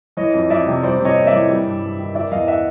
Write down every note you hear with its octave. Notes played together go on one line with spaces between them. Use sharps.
E3 C#5 D#5
F2
F2 D5 E5
C3
G3 C5 D5
C3
C#5 D#5
A#3
D5 E5
E3
G3
G2
G2
D#3
D#3 D5 E5
E2 D#5 F5
E5 F#5